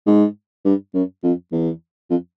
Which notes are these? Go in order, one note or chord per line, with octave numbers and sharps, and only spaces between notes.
G#2
G2
F#2
F2
E2
F2